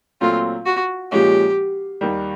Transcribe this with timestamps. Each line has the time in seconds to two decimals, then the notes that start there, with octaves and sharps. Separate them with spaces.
0.21 A#2 F#3 A3 C4 F4
0.66 F#4
1.11 A#2 F3 G#3 C#4 G4
2.01 D#2 D#3 G3